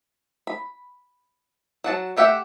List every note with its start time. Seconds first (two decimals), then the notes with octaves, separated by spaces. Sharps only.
0.47 B5
1.84 F#3 F#5 A5
2.17 A3 G4 E5 F#5 G5